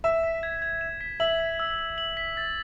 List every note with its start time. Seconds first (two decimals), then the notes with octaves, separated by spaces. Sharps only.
0.04 E5 E7
0.24 B6
0.43 G#6
0.62 G#6
0.81 E7
1.01 B6
1.20 E5 F#7
1.40 B6
1.59 E6
1.79 E6
1.98 F#7
2.17 B6
2.37 A6